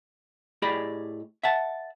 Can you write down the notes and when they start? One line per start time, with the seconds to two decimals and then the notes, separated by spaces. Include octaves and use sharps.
0.62 A2 G4 G#4 D5 D#5 B5
1.43 E5 F#5 A5